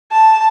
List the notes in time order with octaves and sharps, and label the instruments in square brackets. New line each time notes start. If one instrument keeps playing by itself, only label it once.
[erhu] A5